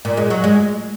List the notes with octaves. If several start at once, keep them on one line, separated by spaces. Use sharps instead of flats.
A#2
G#3
F#3
G#3